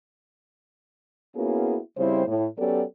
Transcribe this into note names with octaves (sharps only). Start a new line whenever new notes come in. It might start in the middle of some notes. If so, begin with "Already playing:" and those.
A#3 B3 C#4 E4 F#4 G#4
C#3 G3 C4 E4 C5
A2
F#3 B3 C#4 G4 A4 D5